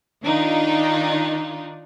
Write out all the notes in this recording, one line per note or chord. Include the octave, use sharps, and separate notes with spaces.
D#3 D4 D#4 F4